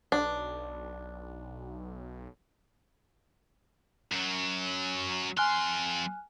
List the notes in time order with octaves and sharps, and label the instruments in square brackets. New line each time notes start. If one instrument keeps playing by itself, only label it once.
[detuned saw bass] B1 [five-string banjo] D4
[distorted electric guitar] F#2 F#3
[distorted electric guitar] F2 C6 [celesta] G#5 F6 F#6